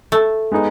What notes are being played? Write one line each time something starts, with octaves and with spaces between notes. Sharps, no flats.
A3
G#3 B3 D#4 G#4